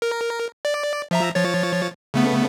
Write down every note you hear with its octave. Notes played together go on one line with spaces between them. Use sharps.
A#4
D5
F3 E5 A#5
F3 C#5 A6
C#3 A3 B3